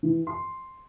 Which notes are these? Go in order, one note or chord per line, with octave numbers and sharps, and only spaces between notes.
E3
C6